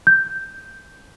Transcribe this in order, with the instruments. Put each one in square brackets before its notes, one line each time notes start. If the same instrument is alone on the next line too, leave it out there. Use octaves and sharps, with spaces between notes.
[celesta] G6